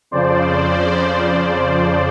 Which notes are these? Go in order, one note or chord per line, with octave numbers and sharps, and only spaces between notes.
F2 C#3 F3 C5 D5